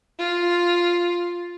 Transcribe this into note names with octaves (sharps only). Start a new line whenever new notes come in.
F4